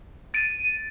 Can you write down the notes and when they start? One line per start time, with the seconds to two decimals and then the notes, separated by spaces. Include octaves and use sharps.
0.34 A6 D7 D#7